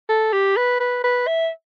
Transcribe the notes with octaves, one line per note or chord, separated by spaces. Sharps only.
A4
G4
B4
B4
B4
E5